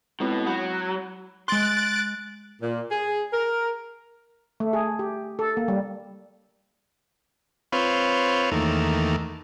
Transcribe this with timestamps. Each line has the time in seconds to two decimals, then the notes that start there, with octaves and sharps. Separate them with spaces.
0.20 B2 G#3 C4 E4
0.46 F#3 F#5 B5 G6
1.48 G#3 C6 F#6 A6 D7
2.62 A#2
2.91 G#4
3.33 A#4
4.60 A3
4.73 G#4
4.99 G4
5.39 A4
5.57 A#3
5.68 G3
7.72 C4 F4 B4 C#5
8.51 E2 D#3 A3 A#3